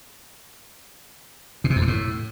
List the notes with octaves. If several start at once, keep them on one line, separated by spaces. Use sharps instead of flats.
B2
C3
F2
G2
A2